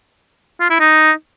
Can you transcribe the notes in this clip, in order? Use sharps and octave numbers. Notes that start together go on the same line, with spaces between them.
F4
E4
D#4